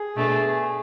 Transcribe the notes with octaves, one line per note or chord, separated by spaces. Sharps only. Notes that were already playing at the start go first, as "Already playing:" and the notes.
Already playing: G#4
B2 A3 D4